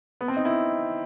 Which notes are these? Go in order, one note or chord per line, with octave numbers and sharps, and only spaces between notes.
B3
C4
D#4
E4